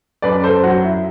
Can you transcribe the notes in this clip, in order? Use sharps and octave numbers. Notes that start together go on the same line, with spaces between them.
F#2 B4 D5
A4 C5
F#3 F#4
E4